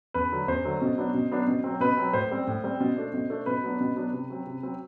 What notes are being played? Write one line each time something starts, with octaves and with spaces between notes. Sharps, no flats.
E2 B4
D3 F#3 A3
E2 C5
D3 F#3 A3
B2
F#3 B3 D4
B2
F#3 B3 D4
B2
F#3 C4
B2 B4
F#3 C4
A2 C5
G3 C4
A2
G3 C4
B2
A3 D4
B2
A3 D4
B2 B4
F#3 B3 D4
B2
F#3 B3 D4
C3
F#3 C4
C3
F#3 C4